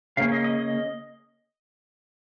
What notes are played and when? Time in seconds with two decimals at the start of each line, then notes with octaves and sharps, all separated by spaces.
0.17 C#3 A#3 C#4 F5
0.32 D#5
0.44 D#5
0.59 D#5